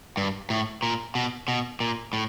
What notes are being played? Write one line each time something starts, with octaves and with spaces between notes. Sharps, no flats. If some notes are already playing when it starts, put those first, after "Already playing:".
G2
A2
A#2
B2
B2
A#2
A2